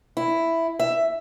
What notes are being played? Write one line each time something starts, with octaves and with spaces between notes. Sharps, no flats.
E4
E5